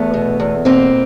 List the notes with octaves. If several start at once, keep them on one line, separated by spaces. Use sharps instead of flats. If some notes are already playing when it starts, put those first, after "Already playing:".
Already playing: E2 A3 B3
B2
E2
B2 A#3 C4